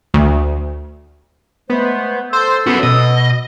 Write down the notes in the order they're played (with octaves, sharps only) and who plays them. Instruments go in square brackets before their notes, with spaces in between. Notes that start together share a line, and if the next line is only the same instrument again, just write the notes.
[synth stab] D2
[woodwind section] G#3 A3 C5 [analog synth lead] B3
[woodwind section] A4 E6 [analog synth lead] C5
[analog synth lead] B3 [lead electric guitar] C#4 F#4
[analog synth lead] B2 [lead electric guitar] D#5